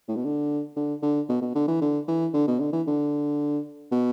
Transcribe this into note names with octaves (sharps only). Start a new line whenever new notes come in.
A2
B2
D3
D3
D3
B2
B2
D3
E3
D3
E3
D3
B2
D3
E3
D3
B2